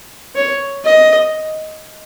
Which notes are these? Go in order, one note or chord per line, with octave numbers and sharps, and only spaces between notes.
C#5
D#5